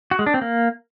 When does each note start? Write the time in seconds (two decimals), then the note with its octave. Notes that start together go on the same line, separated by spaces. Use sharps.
0.11 F#4
0.19 G#3
0.26 D4
0.34 C4
0.42 A#3